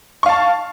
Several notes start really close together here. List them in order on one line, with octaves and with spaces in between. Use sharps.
C#6 F5 A5